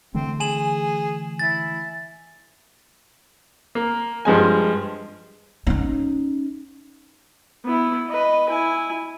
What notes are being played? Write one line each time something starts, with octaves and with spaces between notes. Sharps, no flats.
D3 E3 A3 C4
G#4 G#5 E7 F#7
E4 A6
A#3
G2 F3 G#3 G#5
C#4 D#4
B3 E4
B4 D#5
E4 G#5